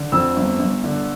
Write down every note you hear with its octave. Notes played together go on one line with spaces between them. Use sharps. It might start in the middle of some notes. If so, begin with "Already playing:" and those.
Already playing: D3
F2 E6
G1
G1
D3